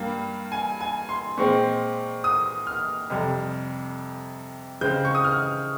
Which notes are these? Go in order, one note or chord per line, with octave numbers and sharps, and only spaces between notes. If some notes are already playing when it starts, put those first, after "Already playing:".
Already playing: G2 G3 A#3
G#5
G#5
C6
A#2 G#3 C4 C#6
D#6
F6
F2 C3 G3
C#3 G#3 C4 G6
C#6
D#6
F6